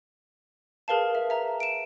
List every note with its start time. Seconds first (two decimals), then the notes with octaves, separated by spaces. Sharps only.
0.88 G#4 A#4 B4 F5 A5
1.15 E5
1.30 E5 A#5
1.60 D7 E7